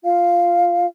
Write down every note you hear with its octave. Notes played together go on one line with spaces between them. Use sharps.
F4 F5